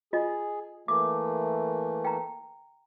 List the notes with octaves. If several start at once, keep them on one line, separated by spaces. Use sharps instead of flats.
F4 G#4 D#5
E3 A3 A#3 D6
G5 A#5